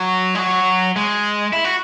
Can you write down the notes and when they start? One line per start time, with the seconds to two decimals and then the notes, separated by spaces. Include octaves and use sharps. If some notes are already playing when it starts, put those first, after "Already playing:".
Already playing: F#3
0.35 G#3
0.39 F#3
0.96 G#3
1.53 E4
1.64 F#4